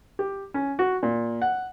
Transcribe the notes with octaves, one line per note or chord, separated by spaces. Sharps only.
G4
C#4
F#4
A#2
F#5